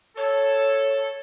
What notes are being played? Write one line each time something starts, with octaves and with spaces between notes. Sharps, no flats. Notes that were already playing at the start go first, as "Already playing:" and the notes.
A4 C#5